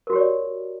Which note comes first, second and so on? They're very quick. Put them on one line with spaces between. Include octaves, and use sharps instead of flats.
A#4 F#4 G4 C#5 D5